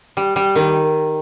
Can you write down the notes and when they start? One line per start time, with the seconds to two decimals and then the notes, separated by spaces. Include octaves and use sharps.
0.17 G3
0.36 G3
0.55 D#3